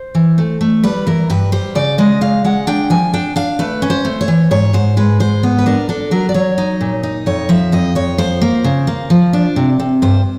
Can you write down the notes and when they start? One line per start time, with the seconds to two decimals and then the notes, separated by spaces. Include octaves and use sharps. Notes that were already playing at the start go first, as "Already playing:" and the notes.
Already playing: C5
0.15 E3
0.38 A3
0.61 A3
0.84 G3 B4
1.07 E3 A#4
1.30 G2 B4
1.52 G3 C5
1.75 C#3 D5
1.98 G#3 D#5
2.21 C#3 F5
2.45 G#3 F#5
2.67 D4 G5
2.90 F3 G#5
3.14 D4 G5
3.36 D4 F5
3.59 A3 B4
3.82 C#4
3.90 C5
4.05 A3
4.21 C#5
4.28 E3
4.51 G#2 C#5
4.73 G#2 C5
4.97 G#3 B4
5.20 G#2 C5
5.43 B3
5.58 B4
5.66 D4 A#4
5.89 D4 A4
6.11 F#3 A#4
6.29 D5
6.34 F#3 C#5
6.58 D#4
6.81 A#2
7.03 D#4
7.26 F2 C#5
7.49 F3 E5
7.72 F2 D#5
7.95 F2 C#5
8.18 F3 C5
8.42 A#3
8.64 C#3
8.87 A#3
9.10 F3
9.33 D4
9.56 C3
9.80 C3
10.02 G2 C5